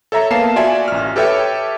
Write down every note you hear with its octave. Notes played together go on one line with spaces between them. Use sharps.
A4 C#5 E5 A#5
A#3 B3 F5 A5 C7 E7
F4 F#4 D5 E5 G#5
A1 F6
G4 A4 B4 C#5 E5 G5